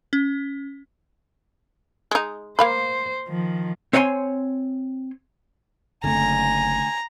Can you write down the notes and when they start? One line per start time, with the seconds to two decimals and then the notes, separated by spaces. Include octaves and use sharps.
0.13 C#4
2.11 G#3 D#4
2.59 A#3 C5 F5 B5
3.28 D#3 F3
3.93 C4 C#5 F5 F#5 G#5 C6
6.04 F#1 D3 A3 C4 G#5 A#5